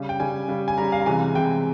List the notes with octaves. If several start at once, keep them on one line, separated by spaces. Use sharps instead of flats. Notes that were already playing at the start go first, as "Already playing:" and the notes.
Already playing: C#3 G3
G5
C#3 G3 G#5
C#3 G3
G#5
C#3 G3 A#5
F5
A#5
C3 E3 G#3 G#5
C3 E3 G#3 G5